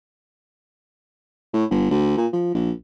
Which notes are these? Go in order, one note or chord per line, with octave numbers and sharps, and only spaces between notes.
A2
G1
D2
A#2
F3
A#1